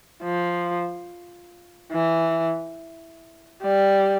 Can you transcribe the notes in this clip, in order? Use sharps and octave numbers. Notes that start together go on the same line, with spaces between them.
F3
E3
G3